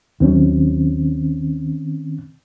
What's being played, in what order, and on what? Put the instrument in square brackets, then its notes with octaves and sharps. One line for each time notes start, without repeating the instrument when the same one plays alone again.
[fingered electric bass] D#2 F#3 [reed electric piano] D#3 C4 C#4